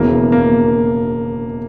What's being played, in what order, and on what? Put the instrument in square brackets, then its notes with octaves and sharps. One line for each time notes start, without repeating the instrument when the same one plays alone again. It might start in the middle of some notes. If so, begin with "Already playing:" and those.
Already playing: [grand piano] E1 E2 C#3 E3 A#3
A#3